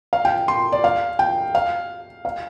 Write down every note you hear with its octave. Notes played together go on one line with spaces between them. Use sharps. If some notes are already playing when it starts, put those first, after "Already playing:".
F5
G5
C6
D5
F5
G5
F5
F5